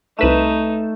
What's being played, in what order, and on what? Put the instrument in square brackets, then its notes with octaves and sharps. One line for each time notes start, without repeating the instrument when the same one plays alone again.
[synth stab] C2 B4 E7 [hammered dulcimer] A3 [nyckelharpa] D#4